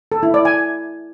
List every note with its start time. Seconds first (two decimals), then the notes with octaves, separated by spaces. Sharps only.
0.12 A4
0.23 E4
0.34 D5
0.45 G#5